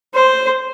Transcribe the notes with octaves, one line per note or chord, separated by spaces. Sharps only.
C5